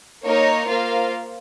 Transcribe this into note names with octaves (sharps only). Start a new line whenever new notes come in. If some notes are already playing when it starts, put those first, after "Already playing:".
A#3 D#4 A#4 C#5
A#3 F4 C5 F5